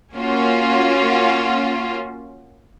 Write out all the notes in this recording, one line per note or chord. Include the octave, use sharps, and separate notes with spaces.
A#3 C#4 F4 F#4